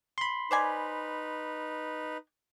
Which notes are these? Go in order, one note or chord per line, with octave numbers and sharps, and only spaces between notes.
B5 C6
D#4 B4 C5 D5 G#5